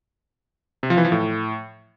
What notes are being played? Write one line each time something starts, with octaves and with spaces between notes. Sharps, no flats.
C3
F3
E3
F3
A2